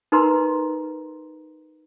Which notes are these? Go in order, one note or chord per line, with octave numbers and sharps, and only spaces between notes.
D#4 A#4 B4 A#5 C6